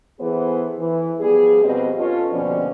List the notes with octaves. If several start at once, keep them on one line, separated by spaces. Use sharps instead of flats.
E3 B3 E4 G#4 A4 C5
E3
F3 G3 B3 G#4
F2 B2 G3 C4 B4 D#5
C#4 F4 A4 B4 C#5 D#5
D#2 B2 D3 F3 C#4 D4